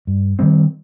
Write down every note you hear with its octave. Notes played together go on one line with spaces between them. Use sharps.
G2
D#3 G3 C4